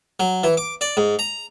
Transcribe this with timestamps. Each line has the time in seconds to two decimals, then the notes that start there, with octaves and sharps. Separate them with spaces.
0.20 F#3
0.43 E3
0.57 D6
0.81 D5
0.97 G#2
1.19 A#5